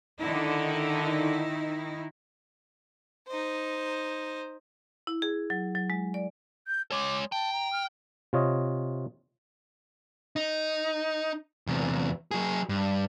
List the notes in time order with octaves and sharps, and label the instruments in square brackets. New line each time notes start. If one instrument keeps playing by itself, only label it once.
[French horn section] D3 [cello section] D#3 D#4 E4
[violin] D#4 C5
[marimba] E4
G#4
F#3
F#3
G#3
D5
[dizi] G6
[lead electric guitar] G#3 C#5 [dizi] D6
[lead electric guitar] G5 [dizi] A5
[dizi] A#5
F6
[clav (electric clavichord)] C3 F4 C#5 D#5
[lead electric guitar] D#4
E2 C3
F#3 G#4
G2